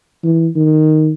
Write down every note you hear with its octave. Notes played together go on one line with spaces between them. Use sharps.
E3
D#3